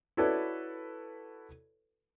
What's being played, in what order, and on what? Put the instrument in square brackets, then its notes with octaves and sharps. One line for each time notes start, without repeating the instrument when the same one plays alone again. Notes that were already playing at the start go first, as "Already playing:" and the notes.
[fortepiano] E4 F#4 A4 B4 C#5 D5